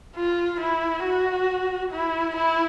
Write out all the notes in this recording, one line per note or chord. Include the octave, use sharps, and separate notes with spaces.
F4
E4
F#4
E4
E4